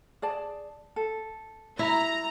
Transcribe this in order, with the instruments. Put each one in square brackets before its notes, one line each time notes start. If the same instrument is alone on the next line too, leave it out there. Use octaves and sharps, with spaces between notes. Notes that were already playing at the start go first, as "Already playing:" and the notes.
[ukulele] G#4 D5 A5
A4
[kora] E4 [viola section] A#5